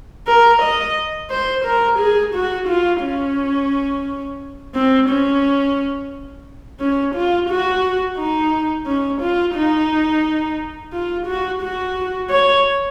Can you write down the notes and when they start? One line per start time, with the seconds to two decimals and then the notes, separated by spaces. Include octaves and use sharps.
0.27 A#4
0.62 D#5
1.30 C5
1.65 A#4
1.99 G#4
2.34 F#4
2.68 F4
3.03 C#4
4.75 C4
5.09 C#4
6.80 C#4
7.15 F4
7.49 F#4
8.18 D#4
8.87 C#4
9.21 F4
9.55 D#4
10.93 F4
11.27 F#4
11.62 F#4
12.30 C#5